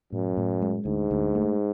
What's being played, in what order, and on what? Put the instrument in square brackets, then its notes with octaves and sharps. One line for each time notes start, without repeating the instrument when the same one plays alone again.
[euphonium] F#2 [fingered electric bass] A2
[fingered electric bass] A2
G#3
[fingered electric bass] D2 [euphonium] G#2
[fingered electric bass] D2
A3